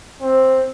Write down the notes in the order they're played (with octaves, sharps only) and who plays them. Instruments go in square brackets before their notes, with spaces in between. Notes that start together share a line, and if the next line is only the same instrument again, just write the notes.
[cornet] C4